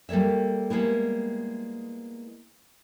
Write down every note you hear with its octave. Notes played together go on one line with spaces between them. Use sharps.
G3 A#3 A4 C#5 E5
G3 G#3 A#3 B3 E4